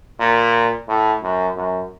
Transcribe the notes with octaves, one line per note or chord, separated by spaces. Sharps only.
A#2
A2
F#2
F#2